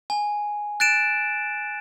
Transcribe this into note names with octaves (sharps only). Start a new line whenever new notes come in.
G#5
F#6 A6 D7 E7